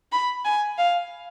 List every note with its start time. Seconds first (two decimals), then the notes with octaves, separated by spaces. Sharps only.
0.12 B5
0.45 G#5
0.78 F5